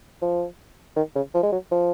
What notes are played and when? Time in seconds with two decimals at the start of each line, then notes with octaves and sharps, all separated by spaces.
0.22 F3
0.96 D#3
1.16 C#3
1.34 F3
1.43 G#3
1.53 F#3
1.72 F3